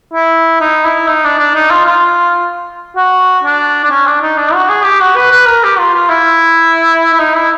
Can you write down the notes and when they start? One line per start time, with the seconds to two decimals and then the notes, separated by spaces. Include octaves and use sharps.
0.14 E4
0.60 D#4
0.85 E4
1.08 D#4
1.24 D4
1.39 D4
1.55 D#4
1.71 F4
1.86 F4
2.96 F#4
3.44 D4
3.84 D4
3.90 C#4
4.07 D4
4.22 D#4
4.37 D4
4.54 F#4
4.69 G#4
4.84 G4
5.01 F#4
5.16 B4
5.31 B4
5.47 A#4
5.64 G4
5.79 F4
5.94 F4
6.10 E4
7.13 E4
7.19 D#4
7.36 E4